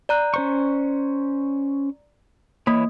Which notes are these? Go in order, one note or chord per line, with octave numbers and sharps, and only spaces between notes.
D5 A#5 F#6
C#4 C5 C#6
E3 A#3 C#5 B5